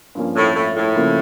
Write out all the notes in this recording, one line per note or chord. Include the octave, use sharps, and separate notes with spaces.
G2 F3 A#3 C#4
A2
A2
A2
C#3 F3 A#3